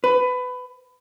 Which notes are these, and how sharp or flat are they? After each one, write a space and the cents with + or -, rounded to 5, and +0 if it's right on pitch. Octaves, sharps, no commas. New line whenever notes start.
B4 +20